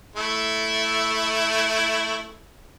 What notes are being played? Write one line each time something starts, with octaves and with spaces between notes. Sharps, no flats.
A3 E4 E5